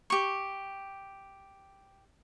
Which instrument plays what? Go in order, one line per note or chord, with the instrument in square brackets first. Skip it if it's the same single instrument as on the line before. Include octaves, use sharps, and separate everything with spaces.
[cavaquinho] G4 C#6